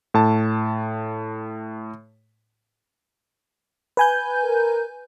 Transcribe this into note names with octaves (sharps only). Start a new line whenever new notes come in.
A2 A5
B4 G#5 G6
A#4